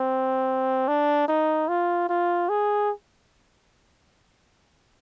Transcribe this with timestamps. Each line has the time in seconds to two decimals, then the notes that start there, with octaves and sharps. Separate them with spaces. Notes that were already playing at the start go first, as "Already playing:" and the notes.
Already playing: C4
0.88 D4
1.28 D#4
1.68 F4
2.09 F4
2.49 G#4